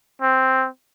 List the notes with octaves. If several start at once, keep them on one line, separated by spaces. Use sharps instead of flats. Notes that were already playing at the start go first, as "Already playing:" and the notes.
C4